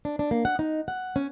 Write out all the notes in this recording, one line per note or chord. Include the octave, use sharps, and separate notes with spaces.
D4
D4
A#3
F#5
D#4
F#5
C#4